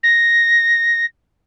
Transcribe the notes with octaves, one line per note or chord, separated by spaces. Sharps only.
A#6